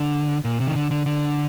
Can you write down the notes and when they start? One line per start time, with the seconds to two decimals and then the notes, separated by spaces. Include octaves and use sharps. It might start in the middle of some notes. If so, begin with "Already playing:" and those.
Already playing: D3
0.45 A#2
0.60 C3
0.67 D#3
0.75 D3
0.91 D3
1.06 D3